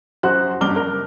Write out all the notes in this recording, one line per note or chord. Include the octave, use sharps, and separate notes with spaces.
F#2 F#4 C5 F#6
F#1 G2 D6 F6 G7
A#4